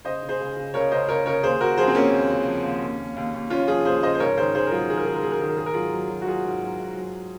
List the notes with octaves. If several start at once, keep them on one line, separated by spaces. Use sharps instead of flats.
C#3 C5 D#5
C#3
G#4 C5
C#2
C#3
C#2 A#4 C#5
C#2 C5 D#5
C#2 A#4 C#5
C#3 A#4 C#5
D#2 G#4 C5
D#2 F#4 A#4
F3 G#4 C5
C4
F3 A#3 C#4
D#2
C#3
F3
D#2
D#2
D#2
D#2
D#2
D#2 C#4 F4
F3 F4 G#4
D#2 G#4 C5
C#3 C5 D#5
C5
G#2 A#4 C#5
D#3 G#4 C5
D#3 G#4 C5
A#4
F#3 F4 G#4
D#3 G#4
A#4
D#3 G#4
A#4
F#3 G#4
A#4
D#3 G#4
A#4
G#2 G#4
A#4
F#3 F4 G#4
F#3
F#3
F#4
F#3 F4 G#4
G#2
F#3
G#2
F#3